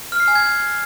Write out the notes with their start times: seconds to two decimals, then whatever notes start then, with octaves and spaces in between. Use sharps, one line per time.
0.12 F6
0.20 C7
0.28 G#5
0.35 G#6